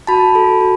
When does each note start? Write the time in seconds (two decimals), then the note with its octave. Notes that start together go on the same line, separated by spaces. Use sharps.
0.07 F#4 A5 B5
0.35 A4
0.61 F#4